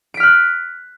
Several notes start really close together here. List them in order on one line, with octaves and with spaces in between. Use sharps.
D7 B6 F6 F#6